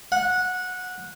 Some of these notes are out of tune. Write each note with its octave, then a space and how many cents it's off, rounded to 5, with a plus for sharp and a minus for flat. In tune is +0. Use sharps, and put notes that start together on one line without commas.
F#5 -15